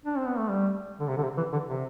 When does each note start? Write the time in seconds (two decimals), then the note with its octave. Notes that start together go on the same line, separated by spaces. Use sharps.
0.05 D4
0.17 C4
0.27 B3
0.38 A3
0.50 G3
1.00 D3
1.08 C3
1.17 D3
1.23 C3
1.37 E3
1.53 D3
1.67 C3